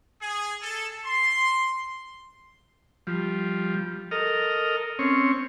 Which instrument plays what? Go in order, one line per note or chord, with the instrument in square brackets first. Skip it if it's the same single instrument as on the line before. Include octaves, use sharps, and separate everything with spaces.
[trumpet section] G#4
A4
C6
[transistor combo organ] F3 G3
A4 A#4 D#5 F6
C4 C#4 C#5